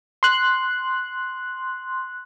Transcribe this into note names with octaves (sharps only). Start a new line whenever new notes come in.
C6 F#6